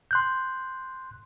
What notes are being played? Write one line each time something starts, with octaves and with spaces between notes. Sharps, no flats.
C6 F#6 G6